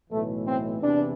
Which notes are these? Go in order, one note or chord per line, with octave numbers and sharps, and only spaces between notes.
B1 A2 E3 A3
C4
E2 C3 E3 D4